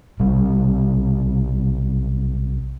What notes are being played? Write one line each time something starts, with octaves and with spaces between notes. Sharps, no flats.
B1 C3 G3